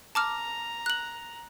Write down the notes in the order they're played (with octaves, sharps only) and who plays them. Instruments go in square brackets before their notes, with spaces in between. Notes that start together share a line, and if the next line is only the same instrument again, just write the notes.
[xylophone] A5 D6 F6 [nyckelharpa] A#5
[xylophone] F#6 F#7